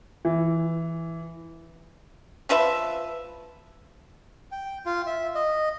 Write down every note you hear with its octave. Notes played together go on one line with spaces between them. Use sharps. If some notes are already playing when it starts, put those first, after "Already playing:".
E3
F3 F4 B4 E5
G5
F4
E5
D#5